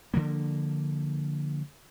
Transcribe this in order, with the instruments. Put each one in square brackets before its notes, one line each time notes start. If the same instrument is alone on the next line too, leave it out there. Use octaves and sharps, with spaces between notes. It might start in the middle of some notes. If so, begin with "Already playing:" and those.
[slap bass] D3 D#3 F3 A#3